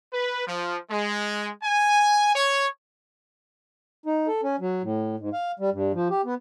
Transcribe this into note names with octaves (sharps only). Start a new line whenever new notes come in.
B4
F3
G#3
G#5
C#5
D#4
A4
C#4
F#3
A2
G#2
F5
G3
G2
F3
G4
B3